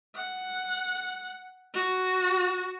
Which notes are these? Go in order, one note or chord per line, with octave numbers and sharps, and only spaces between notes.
F#5
F#4